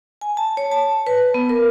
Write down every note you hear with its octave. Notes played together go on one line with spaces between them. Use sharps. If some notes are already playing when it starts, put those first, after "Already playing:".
G#5
A5
C#5
A5
B4
B3
A#4